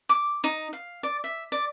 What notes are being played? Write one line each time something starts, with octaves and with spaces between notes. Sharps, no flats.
D6
D#4
F5
D5
E5
D5